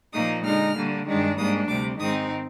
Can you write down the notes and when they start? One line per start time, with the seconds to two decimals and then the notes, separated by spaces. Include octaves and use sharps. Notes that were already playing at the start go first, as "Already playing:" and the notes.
0.13 A#2 F3 A#3 D#4 D#6
0.44 D3 G#3 D#4 F6
0.75 D3 G3 A#3
1.07 G2 D#3 G#3 D4
1.37 G#2 G3 A#3 D4 D#6
1.68 D2 C3 G3 D6
1.99 G#2 D#3 G#3 C4 D#4 D#6